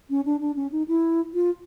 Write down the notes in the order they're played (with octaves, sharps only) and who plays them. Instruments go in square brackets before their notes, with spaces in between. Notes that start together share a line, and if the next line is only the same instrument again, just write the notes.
[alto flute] C#4
D4
D4
C#4
D#4
E4
F4